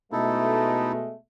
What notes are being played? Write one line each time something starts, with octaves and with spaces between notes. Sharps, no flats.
B2 G#3 A3 D#4 E4 A4